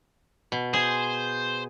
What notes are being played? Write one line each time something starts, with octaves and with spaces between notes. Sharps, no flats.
B2
G#4 C5